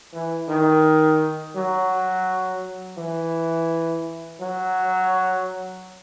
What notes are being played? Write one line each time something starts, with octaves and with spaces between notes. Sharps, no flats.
E3
D#3
F#3
E3
F#3